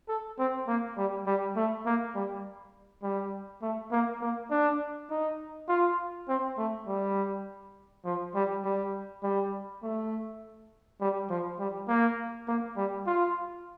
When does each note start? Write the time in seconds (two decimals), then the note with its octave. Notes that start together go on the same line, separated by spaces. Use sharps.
0.08 A4
0.39 C4
0.67 A#3
0.98 G3
1.26 G3
1.56 A3
1.86 A#3
2.15 G3
3.03 G3
3.62 A3
3.91 A#3
4.21 A#3
4.51 D4
5.11 D#4
5.69 F4
6.28 C4
6.58 A3
6.87 G3
8.05 F3
8.35 G3
8.64 G3
9.23 G3
9.83 A3
11.00 G3
11.30 F3
11.59 G3
11.88 A#3
12.48 A#3
12.77 G3
13.07 F4